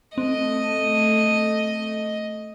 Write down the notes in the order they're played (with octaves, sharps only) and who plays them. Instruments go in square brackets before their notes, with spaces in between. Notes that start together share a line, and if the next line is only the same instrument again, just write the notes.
[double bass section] A3 [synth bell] C4 [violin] D#5